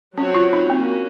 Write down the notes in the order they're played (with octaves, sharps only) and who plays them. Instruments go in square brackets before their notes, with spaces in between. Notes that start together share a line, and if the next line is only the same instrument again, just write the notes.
[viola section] F#3 C4 F#4 C#5 [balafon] C#4
[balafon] F4
D#4
[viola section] A#3 C#4 F#4 [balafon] C4